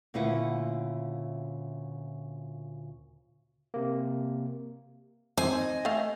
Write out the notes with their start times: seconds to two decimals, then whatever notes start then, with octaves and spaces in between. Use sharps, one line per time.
0.14 D2 A#2 C#3 E4 B4 F#5
3.74 C3 A#3
5.37 C4 D#4 C5 G#5
5.56 D#5
5.85 A3 A4 F5